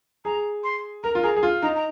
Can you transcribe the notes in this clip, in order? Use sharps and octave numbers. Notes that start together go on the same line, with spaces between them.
G#4 A#5
C6
A#4 A#5
F4
G#4 A#5
G#4
F4
D#4 A#5
A#5